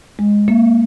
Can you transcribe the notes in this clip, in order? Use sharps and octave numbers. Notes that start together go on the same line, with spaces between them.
G#3
A#3